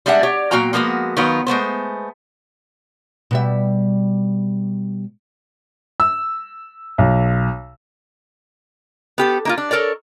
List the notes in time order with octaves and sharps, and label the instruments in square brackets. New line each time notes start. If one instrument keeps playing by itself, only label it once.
[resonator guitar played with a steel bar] G3 G#3 D4 E5 F#5
G4 C#5 D5
A#2 F#3 A#3 F#4 G5 A#5
F3 G#3 A#3 B3 F#4
D#3 F#3 B3 F4
G#3 A3 B3 C5
[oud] B2 G3 E5
[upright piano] E6
B1
[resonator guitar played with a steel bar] B3 G4 A4
A#3 D#4 F4
D4
A4 A#4 C#5 D5